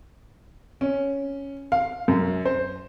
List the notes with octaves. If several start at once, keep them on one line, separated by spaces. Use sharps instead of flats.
C#4
F5
F#2
C5